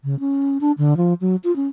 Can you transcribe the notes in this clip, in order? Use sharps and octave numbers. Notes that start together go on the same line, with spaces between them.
C#3
C#4
D4
D3
F3
F#3
F4
C#4